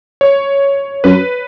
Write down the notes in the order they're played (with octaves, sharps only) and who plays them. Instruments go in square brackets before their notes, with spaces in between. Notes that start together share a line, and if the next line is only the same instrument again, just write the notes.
[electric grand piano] C#5
[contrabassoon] F#2 [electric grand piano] B4